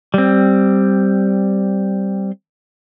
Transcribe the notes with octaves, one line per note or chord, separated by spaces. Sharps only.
G3 C4